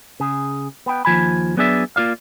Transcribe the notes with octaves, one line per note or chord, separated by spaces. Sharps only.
C#3 G#4
B3 G5
D#2 F3 G#5 B5
F#3 B3 D4 G#4 D5 E5
A#3 F4 D5 F5